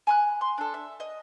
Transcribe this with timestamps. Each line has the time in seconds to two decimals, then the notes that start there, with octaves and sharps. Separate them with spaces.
0.07 G#5 B5 F#6
0.41 C6
0.58 D4 A4
0.74 E5
1.00 D#5